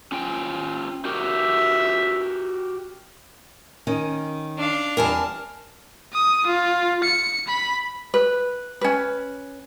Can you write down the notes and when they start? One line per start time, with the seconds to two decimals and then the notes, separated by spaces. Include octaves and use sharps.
0.12 C#4 F4 G5
1.05 F#4 G4 A#4 E5
3.87 D#3 C#4
4.58 D4 F5
4.97 E2 G3 C4 A#4 G#5 A5
6.13 D#6
6.46 F4
7.04 C#7
7.47 B5
8.14 B4
8.81 C#4 B4